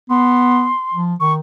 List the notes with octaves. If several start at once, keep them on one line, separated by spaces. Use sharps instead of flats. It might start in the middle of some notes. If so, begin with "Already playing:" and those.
B3 C6
F3
D#3 C#6